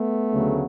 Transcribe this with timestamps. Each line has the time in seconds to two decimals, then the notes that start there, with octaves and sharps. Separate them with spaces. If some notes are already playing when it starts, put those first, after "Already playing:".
Already playing: A3 B3
0.32 D2 C#3 F#3